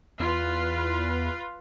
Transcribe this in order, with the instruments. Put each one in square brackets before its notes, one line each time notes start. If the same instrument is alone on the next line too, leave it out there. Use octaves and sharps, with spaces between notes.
[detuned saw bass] E2 [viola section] F4 B4